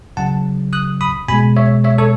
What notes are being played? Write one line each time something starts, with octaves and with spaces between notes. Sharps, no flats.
C#3 F#3 F#5 A5
D#6 F#6
B5 D#6
B2 G#3 G#5 B5
C#5 E5
C#5 E5
A4 C#5